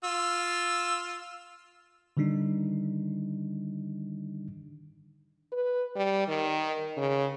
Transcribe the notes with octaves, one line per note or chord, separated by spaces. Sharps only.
F4 E6
D3 D#3 G3 D4 D#4
B4
G3
D#3
C#3